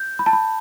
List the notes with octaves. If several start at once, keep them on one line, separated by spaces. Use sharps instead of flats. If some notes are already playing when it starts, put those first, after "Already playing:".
Already playing: G6
B5
A5
B5